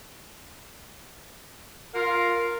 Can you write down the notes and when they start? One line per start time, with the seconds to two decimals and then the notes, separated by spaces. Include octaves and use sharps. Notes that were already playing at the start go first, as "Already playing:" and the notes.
1.94 F4 A#4 F5